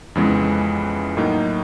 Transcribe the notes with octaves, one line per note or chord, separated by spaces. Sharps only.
F2 C#3 E3 G#3 B3
A2 F#3 A#3 D#4